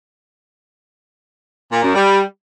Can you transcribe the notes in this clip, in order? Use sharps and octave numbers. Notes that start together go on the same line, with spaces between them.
A#2
F#2
G3